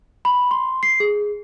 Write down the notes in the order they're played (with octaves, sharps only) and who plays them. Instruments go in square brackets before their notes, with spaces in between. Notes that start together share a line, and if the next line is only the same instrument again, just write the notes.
[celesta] B5
C6
C7
G#4